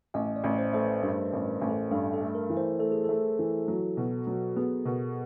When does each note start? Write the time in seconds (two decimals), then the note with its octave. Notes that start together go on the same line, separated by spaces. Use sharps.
0.14 A1 D#5
0.36 D5
0.44 A1
0.58 C5
0.73 A3 C5
0.80 B4
1.02 G2 A#4
1.25 B4
1.33 A1
1.47 A#4
1.61 A1
1.69 A4
1.91 G2 A4
2.13 A4
2.21 A3
2.35 A#4
2.50 E3
2.57 C5
2.79 A3 A4
2.92 G#4
3.04 A3 A4
3.39 E3
3.68 F#3
3.97 B2
4.27 F#3
4.56 B3 G#4
4.85 B2 A#4